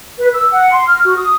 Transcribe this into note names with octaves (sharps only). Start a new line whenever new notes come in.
B4
E6
F#5
C6
F6
F#4
D#6